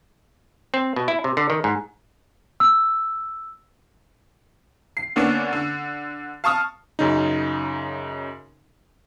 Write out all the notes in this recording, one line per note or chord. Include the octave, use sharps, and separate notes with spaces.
C4
B2
E4
C3
D3
D#3
G#2
E6
C7
D3 A#3 B3 C#4 D4
D3
F5 A5 C#6 D#6 F6
F#2 C#3 D#4